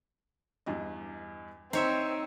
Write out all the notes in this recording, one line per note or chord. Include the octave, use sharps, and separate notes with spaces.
E2 G2 D#5
C4 D#4 C5 C#5 E5 A#5